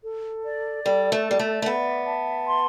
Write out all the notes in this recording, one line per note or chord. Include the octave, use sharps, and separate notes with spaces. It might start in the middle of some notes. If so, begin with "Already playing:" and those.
A4
D5
G3 A4
A3
G3 D5
A3
A3
B3 E5
A5
C6